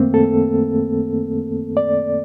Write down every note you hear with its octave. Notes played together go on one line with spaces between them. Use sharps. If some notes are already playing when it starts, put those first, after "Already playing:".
Already playing: F#2 D#3 A3 A#3 C4
A4
D5